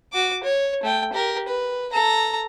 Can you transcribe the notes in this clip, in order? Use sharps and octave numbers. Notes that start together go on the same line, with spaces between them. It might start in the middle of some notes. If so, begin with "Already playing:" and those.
F#4 D6
C#5
A3 G5
G4 A#4
B4
A4 A#5